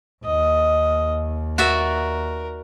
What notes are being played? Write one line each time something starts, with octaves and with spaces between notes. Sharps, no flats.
D#2 D#5
F#4 A#4 D5 E5